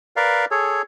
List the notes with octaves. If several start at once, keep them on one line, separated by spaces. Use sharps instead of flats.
A#4 B4 D5 F5
G#4 A4 C#5